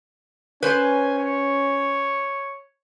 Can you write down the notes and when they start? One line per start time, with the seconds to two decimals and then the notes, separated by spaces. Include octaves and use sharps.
0.63 C#4 B4 C5 G#5
1.19 C#5